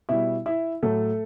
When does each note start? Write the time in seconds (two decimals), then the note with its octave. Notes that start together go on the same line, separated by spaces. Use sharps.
0.09 B2 G3 E4 E5
0.46 E4 E5
0.83 A2 F#3 A3 A4